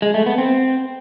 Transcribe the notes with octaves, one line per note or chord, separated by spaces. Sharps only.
G#3
A3
B3
C4